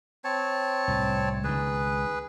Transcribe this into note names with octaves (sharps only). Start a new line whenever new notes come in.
C4 C#5 A5
C2 A2
C#2 D#3 G#4 B4